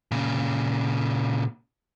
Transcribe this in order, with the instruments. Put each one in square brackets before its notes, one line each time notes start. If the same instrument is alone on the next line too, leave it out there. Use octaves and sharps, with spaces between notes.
[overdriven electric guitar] A#2 C#3